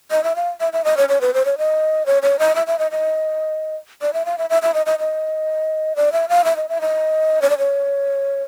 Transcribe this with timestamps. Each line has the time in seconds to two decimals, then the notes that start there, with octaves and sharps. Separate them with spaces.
0.11 D#5
0.24 E5
0.36 F5
0.60 E5
0.73 E5
0.84 D#5
0.97 C#5
1.09 C#5
1.21 B4
1.34 C5
1.45 C#5
1.58 D#5
2.06 C#5
2.22 C#5
2.39 D#5
2.55 E5
2.67 E5
2.79 D#5
2.91 D#5
4.02 D5
4.13 E5
4.26 F5
4.38 E5
4.50 E5
4.62 E5
4.74 D#5
4.86 D#5
4.99 D#5
5.96 D5
6.12 E5
6.29 F5
6.45 E5
6.56 D#5
6.69 E5
6.81 D#5
7.42 C#5
7.50 D5
7.58 C#5